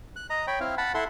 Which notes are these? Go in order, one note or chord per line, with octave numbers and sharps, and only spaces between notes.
F#6
D#5 A#5
C#5 G5 B5
C4 E4 F5
F#5 A5 B5
E4 A4 E5 F#5 C6